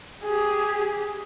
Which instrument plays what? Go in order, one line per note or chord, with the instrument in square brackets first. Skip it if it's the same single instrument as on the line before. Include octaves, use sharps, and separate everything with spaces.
[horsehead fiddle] G4 G#4